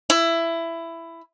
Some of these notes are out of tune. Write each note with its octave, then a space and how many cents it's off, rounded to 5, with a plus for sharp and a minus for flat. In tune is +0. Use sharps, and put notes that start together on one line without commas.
E4 +15